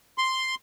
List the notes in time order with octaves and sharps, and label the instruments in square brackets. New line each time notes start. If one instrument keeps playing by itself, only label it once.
[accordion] C6